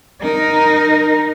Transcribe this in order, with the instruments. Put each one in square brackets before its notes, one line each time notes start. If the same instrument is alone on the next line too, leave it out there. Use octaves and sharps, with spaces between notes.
[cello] D#4 A#4